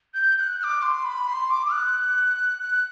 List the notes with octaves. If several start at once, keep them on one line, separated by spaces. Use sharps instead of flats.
G6
G6
F#6
F#6
D6
C6
B5
C6
D6
F#6
F#6